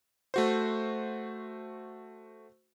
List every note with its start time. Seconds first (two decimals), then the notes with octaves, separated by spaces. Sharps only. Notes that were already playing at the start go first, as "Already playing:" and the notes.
0.34 A3 F#4 C5